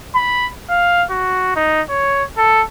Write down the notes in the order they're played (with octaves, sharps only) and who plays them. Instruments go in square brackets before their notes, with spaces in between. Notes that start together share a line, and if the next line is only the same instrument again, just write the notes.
[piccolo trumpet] B5
F5
F#4
D#4
C#5
A4